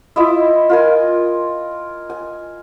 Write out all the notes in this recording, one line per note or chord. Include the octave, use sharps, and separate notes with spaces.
E4 F4 D#5 E5
F4 A#4 G#5
G#5